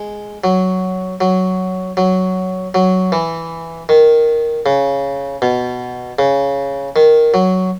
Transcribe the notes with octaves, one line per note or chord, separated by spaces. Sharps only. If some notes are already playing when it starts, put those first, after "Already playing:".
Already playing: G#3
F#3
F#3
F#3
F#3
E3
D#3
C#3
B2
C#3
D#3
F#3